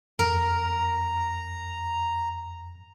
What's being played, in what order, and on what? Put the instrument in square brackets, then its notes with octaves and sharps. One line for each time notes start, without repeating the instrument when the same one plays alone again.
[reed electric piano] F2 [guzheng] A#4 [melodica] A#5